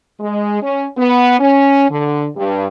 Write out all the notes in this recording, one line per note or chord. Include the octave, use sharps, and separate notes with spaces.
G#3
C#4
B3
C#4
D3
G2